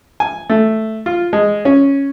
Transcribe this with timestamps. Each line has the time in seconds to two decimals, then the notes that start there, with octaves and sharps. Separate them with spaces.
0.20 G#5
0.50 A3
1.06 F4
1.33 G#3
1.65 C#4